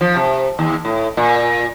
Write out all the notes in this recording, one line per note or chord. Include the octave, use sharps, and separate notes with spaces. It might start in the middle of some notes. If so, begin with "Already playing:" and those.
F3
C3
D#2
A2
A#2